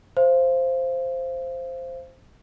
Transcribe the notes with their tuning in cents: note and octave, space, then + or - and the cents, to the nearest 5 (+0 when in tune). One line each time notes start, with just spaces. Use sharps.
C5 +0 F5 -30